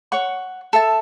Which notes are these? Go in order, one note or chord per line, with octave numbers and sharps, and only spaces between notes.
C#5 F#5 C#6
A4 E5 A5